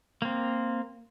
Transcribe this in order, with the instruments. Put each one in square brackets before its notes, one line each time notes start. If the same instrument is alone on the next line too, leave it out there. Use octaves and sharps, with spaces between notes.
[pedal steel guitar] A#3 C4